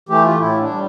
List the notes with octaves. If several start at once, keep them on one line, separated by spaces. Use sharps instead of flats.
E3 A3 G4
F4
A2 E4
D4
G3